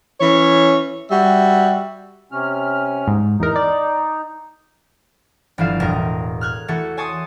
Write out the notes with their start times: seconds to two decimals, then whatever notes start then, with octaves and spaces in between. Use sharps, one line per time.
0.21 E3 C#4 C#5
1.10 G3 F#4 E5
2.32 C3 C#4 F6
3.08 G#2
3.40 E2 D#4 A#4
3.56 D5
5.58 G1 E3 F3 F5 E7
5.80 E1 A2 A#4 D#6
6.41 F6 F#6 G#6
6.68 E3 A3 F#4 A4
6.97 C#5 G#5 A5 C6 C#6 D#6